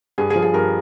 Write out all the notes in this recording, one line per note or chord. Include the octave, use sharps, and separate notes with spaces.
G2 G#4
G#4
F3
G#4
G2 A#4